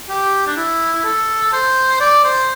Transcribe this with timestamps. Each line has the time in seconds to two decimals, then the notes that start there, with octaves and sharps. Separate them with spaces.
0.09 G4
0.47 D4
0.56 E4
1.04 A4
1.52 C5
2.00 D5
2.24 C5